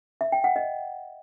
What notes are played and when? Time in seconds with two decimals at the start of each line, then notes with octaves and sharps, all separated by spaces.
0.21 E5
0.32 G5
0.44 F#5
0.56 D#5